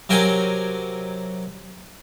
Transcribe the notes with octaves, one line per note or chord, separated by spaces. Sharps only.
C3 F#3 A#4 G5 G#5